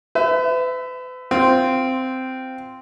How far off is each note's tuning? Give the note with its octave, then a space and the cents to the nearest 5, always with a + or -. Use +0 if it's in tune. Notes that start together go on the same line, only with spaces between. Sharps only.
B4 +40 E5 +0
C4 -10 F4 +0